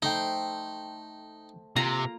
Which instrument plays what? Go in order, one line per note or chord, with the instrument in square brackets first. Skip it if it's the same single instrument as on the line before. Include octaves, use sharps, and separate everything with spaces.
[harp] A3 C5 G5 [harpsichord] D#4
[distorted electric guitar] C3 [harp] A#3 F4 [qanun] A#5